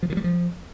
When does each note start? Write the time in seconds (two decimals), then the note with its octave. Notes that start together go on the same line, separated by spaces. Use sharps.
0.03 F3
0.10 D#3
0.17 G3
0.24 F3